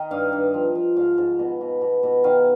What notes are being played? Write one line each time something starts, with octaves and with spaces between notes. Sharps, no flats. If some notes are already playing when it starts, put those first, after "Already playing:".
Already playing: D#3 D#5
G2 F5
G2
F3
F3
G#2 F5
G#2
B2 D#5
B2
B2
B2
D#3 F5